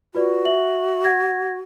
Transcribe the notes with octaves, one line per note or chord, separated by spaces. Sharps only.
F4 F#4 B4 D5
E5 F#7
F#5 G#6 A#6